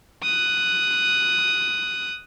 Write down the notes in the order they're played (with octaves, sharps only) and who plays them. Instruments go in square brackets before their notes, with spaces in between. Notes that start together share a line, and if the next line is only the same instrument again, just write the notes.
[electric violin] D#6 F#6